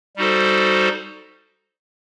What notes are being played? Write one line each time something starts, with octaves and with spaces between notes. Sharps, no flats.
G3 D#4 F#4 A4 C5